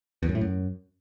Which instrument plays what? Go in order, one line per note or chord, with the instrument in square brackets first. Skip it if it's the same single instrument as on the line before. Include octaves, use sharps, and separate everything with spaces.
[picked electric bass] E2
F#2
A2
F#2